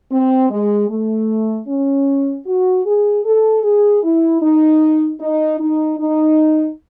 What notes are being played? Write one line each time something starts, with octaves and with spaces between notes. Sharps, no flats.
C4
G#3
A3
C#4
F#4
G#4
A4
G#4
E4
D#4
D#4
D#4
D#4